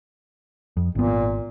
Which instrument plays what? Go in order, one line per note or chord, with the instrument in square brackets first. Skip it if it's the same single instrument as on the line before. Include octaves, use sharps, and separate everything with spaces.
[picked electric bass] F2
[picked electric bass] G#1 B3 [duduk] A#2